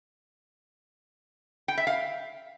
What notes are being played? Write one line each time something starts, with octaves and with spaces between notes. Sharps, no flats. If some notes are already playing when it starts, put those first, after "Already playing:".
G5
E5
F5